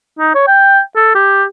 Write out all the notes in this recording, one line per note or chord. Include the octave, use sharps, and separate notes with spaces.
D#4
C#5
G5
A4
G4